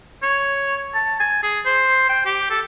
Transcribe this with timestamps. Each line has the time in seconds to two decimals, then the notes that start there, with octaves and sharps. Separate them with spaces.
0.23 C#5
0.95 A5
1.20 G#5
1.43 G#4
1.66 C5
2.09 G5
2.26 G4
2.50 A4